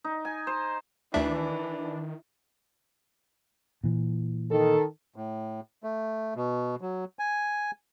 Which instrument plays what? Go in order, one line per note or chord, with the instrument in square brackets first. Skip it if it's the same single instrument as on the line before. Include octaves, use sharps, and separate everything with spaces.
[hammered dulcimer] D#4
G#5
C5
[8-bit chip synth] D2 E5 [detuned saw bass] D#3 [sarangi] E3 [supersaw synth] D4
[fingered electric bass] A#2 E3
[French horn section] D#3 A4
[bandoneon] A2
A3
B2
F#3
G#5